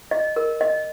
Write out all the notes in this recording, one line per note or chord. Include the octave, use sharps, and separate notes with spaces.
D#5
A#4
D#5